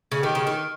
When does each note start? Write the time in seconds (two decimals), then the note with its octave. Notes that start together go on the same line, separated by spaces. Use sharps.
0.12 C#3
0.23 D#3 G4
0.35 C#3
0.47 D#3